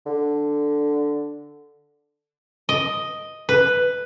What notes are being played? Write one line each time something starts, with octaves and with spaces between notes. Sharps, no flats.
D3
D#5
B4